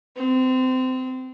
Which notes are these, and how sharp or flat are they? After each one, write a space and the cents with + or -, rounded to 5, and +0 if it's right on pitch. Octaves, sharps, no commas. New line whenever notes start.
C4 -25